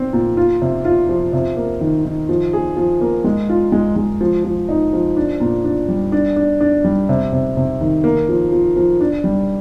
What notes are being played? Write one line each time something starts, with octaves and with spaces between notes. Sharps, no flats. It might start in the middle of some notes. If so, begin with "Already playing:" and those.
Already playing: C4
A#2
F4
C3
F4
F3
C3
A#3
D#3
D#3
F3
G#4
F3
A#3
G#3
F4
G#3
G#3
F3
F3
D#4
F3
D4
A#2
D4
G3
D4
D4
D4
G3
C3
C3
C3
D#3
A#3
F3
F3
F3
D4
G3